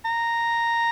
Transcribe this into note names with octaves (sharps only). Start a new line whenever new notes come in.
A#5